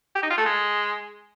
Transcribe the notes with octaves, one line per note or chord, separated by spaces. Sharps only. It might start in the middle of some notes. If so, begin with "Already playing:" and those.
G4
D#4
F4
A3
G#3